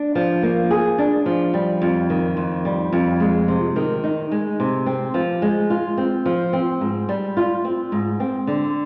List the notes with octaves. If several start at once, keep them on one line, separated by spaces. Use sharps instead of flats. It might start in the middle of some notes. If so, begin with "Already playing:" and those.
Already playing: D4
F3
A#3
G#4
D4
F3
G3
F2
D#3
F2
G3
F2
G#3
C3
D#3
D#4
G#3
C3
C4
F3
G#3
F4
C4
F3
C4
G#2
G3
F4
C4
G#2
C4
D3